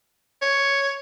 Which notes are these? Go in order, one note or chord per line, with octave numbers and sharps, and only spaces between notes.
C#5